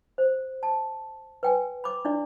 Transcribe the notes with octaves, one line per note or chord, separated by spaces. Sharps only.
C5
A5
B4 G5 G#5
B5 D6
D4 E4 D5